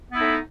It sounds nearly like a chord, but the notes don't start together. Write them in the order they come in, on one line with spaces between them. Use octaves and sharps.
B3 E4 D#4 A3